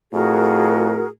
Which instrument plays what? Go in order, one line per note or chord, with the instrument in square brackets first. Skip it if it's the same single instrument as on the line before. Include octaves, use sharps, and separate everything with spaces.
[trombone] F2 [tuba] A2 [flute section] F#4 G#4 A#4